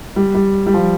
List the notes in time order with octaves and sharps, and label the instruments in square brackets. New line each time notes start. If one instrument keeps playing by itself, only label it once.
[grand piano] G3
G3
G3
F3